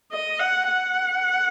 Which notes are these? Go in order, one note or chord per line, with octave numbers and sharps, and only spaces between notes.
D#5
F#5
F#5